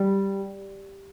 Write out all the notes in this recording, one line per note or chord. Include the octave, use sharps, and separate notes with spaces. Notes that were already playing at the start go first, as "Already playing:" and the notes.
Already playing: G3